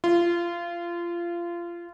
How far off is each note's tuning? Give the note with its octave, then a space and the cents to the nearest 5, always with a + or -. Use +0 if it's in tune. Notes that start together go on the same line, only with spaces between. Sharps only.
F4 -25